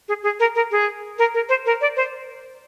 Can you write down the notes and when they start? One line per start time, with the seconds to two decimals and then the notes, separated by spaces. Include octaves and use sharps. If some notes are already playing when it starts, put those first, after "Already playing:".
0.08 G#4
0.23 G#4
0.40 A#4
0.55 A#4
0.71 G#4
1.19 A#4
1.34 A#4
1.49 C5
1.66 A#4
1.81 D5
1.96 C5